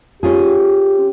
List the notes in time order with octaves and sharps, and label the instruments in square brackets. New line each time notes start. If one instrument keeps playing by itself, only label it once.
[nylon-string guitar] C#4 F4 G#4 [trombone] G4